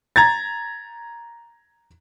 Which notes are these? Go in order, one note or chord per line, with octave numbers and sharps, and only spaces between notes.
A#5 G#6 A6